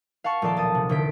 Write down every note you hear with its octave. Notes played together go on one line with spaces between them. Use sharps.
F5 F#5 A5 C#6
D#1 F3 A4 D5 A5 C6
B1 A5 D#6
C3
E1 D3 C5 B6 D7